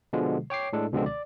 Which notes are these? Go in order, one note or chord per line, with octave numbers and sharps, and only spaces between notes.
B2 D3 F3 G#3
C#5 G5 D6 C7
A2 G#3 D4 A4
C#2 B2 D3 F3 G#3 C4
D5